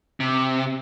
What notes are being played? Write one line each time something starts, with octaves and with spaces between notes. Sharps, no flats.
C3